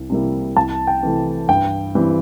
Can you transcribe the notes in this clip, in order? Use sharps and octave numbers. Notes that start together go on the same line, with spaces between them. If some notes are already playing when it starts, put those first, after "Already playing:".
Already playing: C2
C3 G3 A#3 E4
C2 A5
G5
C3 E3 A3
G2 G5
E3 G3 C4